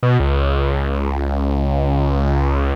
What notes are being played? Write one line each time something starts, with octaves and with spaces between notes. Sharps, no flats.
B2
C#2